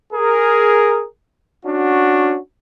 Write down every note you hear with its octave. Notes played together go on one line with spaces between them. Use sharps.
G#4 A#4
C#4 D4 F#4